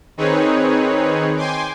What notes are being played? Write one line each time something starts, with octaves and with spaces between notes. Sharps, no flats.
D#3 C4 D#4 G#4 B4 C#5
G5 G#5 C6 D6